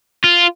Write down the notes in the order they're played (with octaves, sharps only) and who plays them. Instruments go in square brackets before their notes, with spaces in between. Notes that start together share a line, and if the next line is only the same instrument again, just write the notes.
[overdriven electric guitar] F4